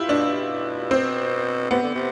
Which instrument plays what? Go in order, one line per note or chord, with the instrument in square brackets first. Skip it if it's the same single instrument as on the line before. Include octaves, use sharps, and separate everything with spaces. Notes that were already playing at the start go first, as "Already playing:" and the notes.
Already playing: [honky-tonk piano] E4 F4 G4
[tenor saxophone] B2 [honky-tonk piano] D4
[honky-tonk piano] C4
[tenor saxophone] C3 [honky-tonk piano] B3
[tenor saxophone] D3
C3